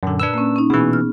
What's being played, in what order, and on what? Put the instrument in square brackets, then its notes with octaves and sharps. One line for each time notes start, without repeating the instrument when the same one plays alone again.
[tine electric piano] F#2 D3 [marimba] A#2
[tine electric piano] D4 B4 E6
[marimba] A#3 C#4
C#4 D#4
[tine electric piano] B2 E3 [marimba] B3 G#4
[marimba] F6